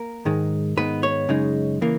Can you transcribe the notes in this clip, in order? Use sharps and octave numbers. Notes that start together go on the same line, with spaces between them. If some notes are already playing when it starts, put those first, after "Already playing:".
Already playing: A#3 A#4
G#2 D#3 G#3
G#2 D#3 G#3 B3 D#4 B4
C#5
F#2 C#3 G#3 D#4
C#3 E3 A#3